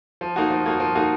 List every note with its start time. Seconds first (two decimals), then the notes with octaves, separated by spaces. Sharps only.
0.21 F3
0.36 A#3 D#4 F#4
0.50 F3
0.66 A#3 D#4 F#4
0.80 F3
0.95 A#3 D#4 F#4